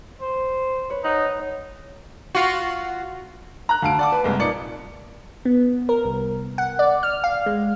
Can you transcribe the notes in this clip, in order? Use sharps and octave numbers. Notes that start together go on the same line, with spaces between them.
C5
B4 C#5
D#4 F#5
F4 F#4
A#5 F#6
D2 F5 A5 D7
D5 F#5 D6
B4
C2 G#3 A#3
A#2 D#4 D5 C#7
B3
A#4
C2
F#5
D5
F6
F5
G#3